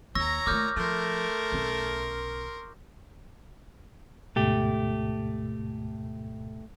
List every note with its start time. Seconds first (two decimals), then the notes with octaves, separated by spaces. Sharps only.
0.15 D#2 C#5 A#5 C#6 E6 A#6
0.46 A#2 G3 A3 D6 F6 G6
0.76 F3 A3 A#4 C6
1.52 B1 C#4
4.36 D2 G#2 B2 A3 G4